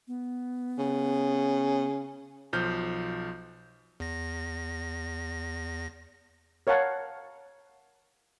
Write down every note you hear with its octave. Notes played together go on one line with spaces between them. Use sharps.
B3
C#3
B1 F3 F6 G6
E2 A#6
A#4 C#5 F5 F#5 A5